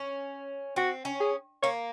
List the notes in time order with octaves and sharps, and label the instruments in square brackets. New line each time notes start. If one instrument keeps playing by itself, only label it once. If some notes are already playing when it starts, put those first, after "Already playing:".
Already playing: [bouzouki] C#4
[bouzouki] C4 [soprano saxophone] F#4
[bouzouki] C#4
[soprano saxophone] G#4
[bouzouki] A#3 [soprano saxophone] C#5